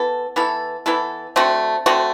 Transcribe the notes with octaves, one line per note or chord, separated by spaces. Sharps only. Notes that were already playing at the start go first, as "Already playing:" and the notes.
Already playing: E3 B3 E4 A4
E3 B3 E4 A4
E3 B3 E4 A4
D3 A3 C4 F#4
D3 A3 C4 F#4